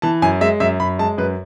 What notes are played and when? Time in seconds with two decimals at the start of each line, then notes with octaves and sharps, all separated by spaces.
0.02 E3 A5
0.22 F#2 G#5
0.41 G#3 E5
0.60 F#2 E5
0.80 F#2 B5
0.99 G#3 A5
1.18 F#2 B4